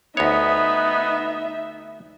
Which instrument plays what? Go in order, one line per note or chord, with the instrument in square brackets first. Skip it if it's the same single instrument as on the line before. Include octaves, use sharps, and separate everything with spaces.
[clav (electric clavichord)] D2 C#5 [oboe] B3 [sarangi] D#4 [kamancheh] E5